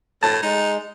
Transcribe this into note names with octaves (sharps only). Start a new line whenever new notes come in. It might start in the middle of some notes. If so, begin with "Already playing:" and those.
A2 A5
G#3 D#4